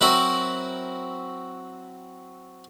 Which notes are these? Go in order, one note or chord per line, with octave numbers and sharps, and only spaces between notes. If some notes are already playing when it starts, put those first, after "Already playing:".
F#3 C4 E4 F#4 A#4 E5